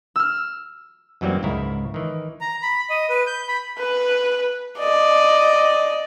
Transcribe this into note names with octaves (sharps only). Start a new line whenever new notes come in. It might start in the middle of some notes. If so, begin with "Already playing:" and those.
E6 F6
F#2 E3 F#3 G3 A#3 C4
C#2 G#2 C#3 E4 A#4
D#3 E3
A#5
B5
D#5
B4
G6
B5
B4
D5 D#5